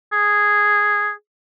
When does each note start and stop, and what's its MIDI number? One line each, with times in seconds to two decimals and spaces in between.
0.13 1.11 68